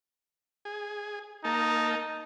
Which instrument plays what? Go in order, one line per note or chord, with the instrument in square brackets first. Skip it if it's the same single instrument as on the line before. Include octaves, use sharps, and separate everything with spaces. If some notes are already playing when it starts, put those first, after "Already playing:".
[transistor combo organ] G#4
[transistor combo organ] A#3 A5 [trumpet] D#4